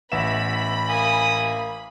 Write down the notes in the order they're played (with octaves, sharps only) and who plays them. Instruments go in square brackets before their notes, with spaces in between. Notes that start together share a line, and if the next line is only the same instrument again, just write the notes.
[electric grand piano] A1 E5 E7 [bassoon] B3 [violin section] B5
[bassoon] A#3 [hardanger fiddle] G#5 D#6